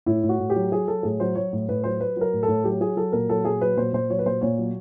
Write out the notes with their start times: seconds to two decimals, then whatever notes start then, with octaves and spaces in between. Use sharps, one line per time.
0.06 A2 E4
0.23 A2
0.29 F#4
0.39 A2
0.50 G4
0.56 F#3
0.72 F#3 G#4
0.88 F#3 A4
1.03 A2 G#4
1.20 F#3 C5
1.35 F#3 C#5
1.53 A2
1.69 A2 B4
1.84 F#3 C5
2.00 F#3 B4
2.16 F#3 A#4
2.33 A2
2.43 A4
2.48 A2
2.64 F#3 G4
2.80 F#3 G#4
2.96 F#3 A4
3.12 A#2 A#4
3.29 F#3 A4
3.45 A#2 G#4
3.61 F#3 B4
3.77 A#2 C5
3.93 A#2 C5
4.10 F#3 C#5
4.19 B4
4.26 A#2 C5
4.41 A#2 C#5
4.58 F#3